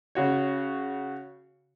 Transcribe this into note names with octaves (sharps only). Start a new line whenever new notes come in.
C#3 F#4 C#5